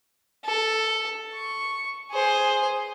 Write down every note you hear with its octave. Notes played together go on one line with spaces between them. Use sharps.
A4
C#6
G#4 C5